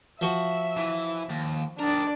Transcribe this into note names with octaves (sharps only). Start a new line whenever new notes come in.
F3 F#4 E5
E3
D#2
D4 G4 A#4 D5